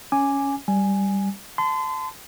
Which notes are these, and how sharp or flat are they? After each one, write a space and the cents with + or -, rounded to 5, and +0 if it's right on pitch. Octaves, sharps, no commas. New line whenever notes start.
C#4 +0 G#5 +0 D6 +0
G3 +0 G#5 +0
A5 -5 C6 -30